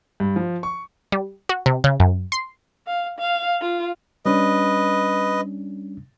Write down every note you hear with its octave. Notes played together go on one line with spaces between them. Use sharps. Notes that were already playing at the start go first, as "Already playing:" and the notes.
G2
F3
C#6
G3
F#4
C3
C#3
F#2
C6
F5
F5
F4
G3 C#4 D4 B4 D#5